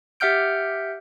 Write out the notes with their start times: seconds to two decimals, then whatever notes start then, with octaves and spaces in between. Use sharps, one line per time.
0.20 G4 E5 F#5 F6 G6 D7